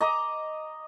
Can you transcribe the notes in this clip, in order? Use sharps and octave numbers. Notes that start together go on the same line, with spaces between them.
D#5 A#5 D6